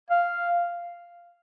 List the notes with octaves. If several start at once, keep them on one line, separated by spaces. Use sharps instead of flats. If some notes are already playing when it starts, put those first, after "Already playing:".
F5